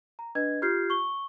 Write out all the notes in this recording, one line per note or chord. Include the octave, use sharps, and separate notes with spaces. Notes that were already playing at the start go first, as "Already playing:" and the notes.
A#5
D4 B4 D#5 G#6
F4 G4 F6 G6 G#6 C7
C#6 G7